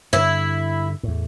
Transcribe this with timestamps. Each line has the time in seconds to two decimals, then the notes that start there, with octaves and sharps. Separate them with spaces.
0.13 G2 D3 E4
1.03 E2 A2